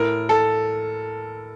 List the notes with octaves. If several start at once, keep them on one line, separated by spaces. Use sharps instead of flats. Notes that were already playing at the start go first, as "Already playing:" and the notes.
Already playing: A2 A#4
A4